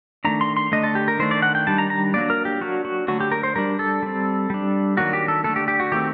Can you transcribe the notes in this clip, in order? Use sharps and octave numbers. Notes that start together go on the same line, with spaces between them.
D#3 A3 D4 A#5
C6
C6
D3 A3 D4 D#5
A4
G4
A#4
D#3 A3 D4 C5
D5
F#5
G5
D#3 G3 D4 A5
A#5
A#5
F#3 A#3 D4 D5
A#4
G4
F#3 A#3 D4 F#4
F#4
D3 F#3 A3 F#4
G4
A#4
C5
G3 D4 A#4
A4
G3 C4
G3 D4
D#3 F#3 A#3 D4 F#4
G4
A4
D3 A3 D4 A4
G4
G4
F#4
D#3 A3 C4 G4